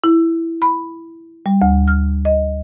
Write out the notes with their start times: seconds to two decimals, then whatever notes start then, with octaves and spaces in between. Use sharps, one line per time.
0.04 E4
0.62 B5
1.46 G3
1.62 D2
1.88 F6
2.25 D#5